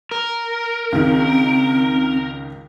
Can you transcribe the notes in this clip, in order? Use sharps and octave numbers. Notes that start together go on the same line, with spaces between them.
A#4
C#2 D#3 C4